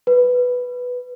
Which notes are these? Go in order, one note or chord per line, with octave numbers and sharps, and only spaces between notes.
B4